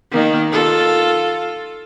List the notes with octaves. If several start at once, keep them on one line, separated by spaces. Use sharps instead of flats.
D#3 A#3
F4 A4